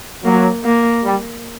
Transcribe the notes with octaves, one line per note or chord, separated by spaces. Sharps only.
F#3 A#3
A#3
G3